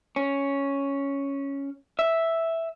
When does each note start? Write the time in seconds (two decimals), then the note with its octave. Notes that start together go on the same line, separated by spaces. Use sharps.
0.16 C#4
1.99 E5